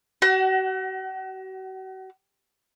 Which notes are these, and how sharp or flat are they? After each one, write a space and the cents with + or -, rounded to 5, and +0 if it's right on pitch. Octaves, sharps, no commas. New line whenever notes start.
F#4 +40 F#5 +20